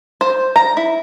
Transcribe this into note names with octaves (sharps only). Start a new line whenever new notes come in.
C5
A#5
E4